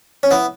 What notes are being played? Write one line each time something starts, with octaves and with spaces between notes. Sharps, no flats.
C#4
B3 E4